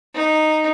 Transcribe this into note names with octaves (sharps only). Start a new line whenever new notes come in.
D#4